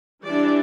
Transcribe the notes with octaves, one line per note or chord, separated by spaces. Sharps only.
E3 G3 D4 D5